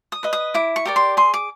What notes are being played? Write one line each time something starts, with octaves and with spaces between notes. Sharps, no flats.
D#6
B4 D#5
D#6
E4 D6
C#6
G4 A#4 D5
C6
G#4 C6
D6